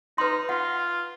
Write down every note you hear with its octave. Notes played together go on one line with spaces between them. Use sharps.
D#4 B4 C6
F4 F#5